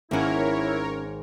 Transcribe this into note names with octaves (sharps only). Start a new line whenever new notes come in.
G#1 A#3 C#4 E4 A#4 C#5 F#5